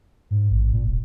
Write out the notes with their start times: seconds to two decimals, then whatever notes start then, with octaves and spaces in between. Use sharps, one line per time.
0.31 G#2
0.50 A1
0.73 A#2
0.87 D#1